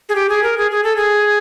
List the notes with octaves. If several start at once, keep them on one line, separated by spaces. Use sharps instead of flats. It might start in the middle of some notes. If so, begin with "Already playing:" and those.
G#4
G4
G#4
A#4
G#4
G#4
A4
G#4